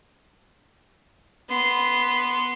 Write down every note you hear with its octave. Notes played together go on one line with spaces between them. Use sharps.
B3 C6